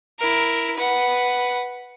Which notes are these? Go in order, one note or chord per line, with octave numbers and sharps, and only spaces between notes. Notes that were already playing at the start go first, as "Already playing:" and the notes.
E4 A#4
B4 F#5